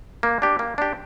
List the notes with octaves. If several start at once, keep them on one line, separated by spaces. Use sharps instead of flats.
A#3
D4 G4
A#3
D4 G4